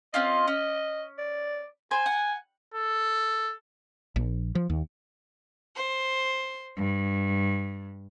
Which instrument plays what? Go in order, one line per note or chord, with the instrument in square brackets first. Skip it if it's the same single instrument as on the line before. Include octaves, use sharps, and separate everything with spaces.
[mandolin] C4 C#4 F4 [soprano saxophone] D#5
[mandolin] C#4
[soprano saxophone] D5
[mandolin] C5 [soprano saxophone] G#5
[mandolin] F#5
[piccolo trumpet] A4
[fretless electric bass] A#1
F3
D#2
[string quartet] C5
G2